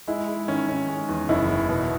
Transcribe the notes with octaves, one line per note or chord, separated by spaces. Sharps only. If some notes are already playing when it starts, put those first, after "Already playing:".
G#3 E4
G#3
D#3 C#4
D#3 C#4
G#3
E2
F#1 E4
E2
B2